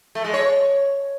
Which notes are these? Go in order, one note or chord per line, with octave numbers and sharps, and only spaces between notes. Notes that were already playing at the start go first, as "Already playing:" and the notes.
A3
G#3
C#5